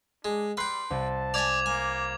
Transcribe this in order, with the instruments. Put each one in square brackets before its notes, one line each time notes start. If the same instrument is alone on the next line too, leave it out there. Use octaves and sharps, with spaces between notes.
[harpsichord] G#3 [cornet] D4
[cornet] G3 [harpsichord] B4 G5 [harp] C6 F#6 C7
[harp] C2 [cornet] A5
[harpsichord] D5 G#5 [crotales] D6 G#6 F7
[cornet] A#3 [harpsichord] G#5